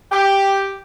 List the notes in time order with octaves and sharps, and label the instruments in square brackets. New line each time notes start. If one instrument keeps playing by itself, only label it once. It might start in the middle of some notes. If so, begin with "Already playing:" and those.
[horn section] G4